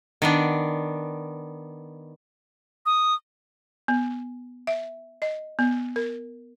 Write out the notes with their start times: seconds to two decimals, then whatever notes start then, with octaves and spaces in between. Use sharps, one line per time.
0.22 D#3 B3 D4
2.86 D#6
3.88 B3
4.67 E5
5.22 D#5
5.59 B3
5.96 A#4